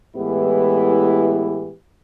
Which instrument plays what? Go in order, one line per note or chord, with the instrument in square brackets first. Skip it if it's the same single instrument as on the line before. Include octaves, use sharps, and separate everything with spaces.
[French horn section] A2 E3 G#3 B3 E4 G4